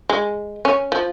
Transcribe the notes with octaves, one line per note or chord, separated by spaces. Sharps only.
G#3
C#4
F3